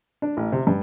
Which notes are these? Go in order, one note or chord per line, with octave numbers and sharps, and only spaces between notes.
D4
A1
C3
G2